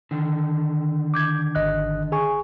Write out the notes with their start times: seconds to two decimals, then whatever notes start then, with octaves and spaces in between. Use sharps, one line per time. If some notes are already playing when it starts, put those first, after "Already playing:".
0.11 D3 D#3
1.14 D6 G6 G#6
1.55 G#1 D#5 F#6
2.12 G#4 G#5 C#6